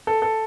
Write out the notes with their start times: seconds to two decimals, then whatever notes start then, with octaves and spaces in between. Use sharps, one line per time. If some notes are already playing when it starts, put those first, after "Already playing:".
0.07 A4
0.22 A4